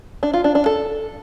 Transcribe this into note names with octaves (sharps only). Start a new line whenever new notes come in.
D4
F4
D4
D4
A4